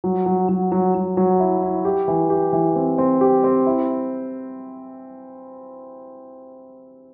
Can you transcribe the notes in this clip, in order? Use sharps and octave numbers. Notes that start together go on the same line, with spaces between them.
F#3
F#3
F#3
F#3
F#3
F#3
E4
E4
G4
E3
G4
E3
C4
C4
G4
C4
E4